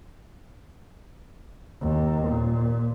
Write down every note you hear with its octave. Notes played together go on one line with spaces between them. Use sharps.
D#2
A#2